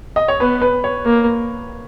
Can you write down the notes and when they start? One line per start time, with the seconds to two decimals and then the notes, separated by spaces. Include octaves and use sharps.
0.16 D#5
0.28 C#5
0.40 B3 B4
0.62 B4
0.84 C#5
1.05 A#3